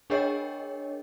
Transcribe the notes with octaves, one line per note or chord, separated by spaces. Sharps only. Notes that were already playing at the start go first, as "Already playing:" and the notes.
D4 G#4 A#4 C#5 D#5 G5